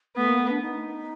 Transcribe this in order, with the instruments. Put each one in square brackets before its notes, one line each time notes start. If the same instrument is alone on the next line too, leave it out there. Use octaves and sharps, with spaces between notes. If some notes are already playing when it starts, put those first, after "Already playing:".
[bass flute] A3 [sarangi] B3
[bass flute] A#3
A3
D4
D#4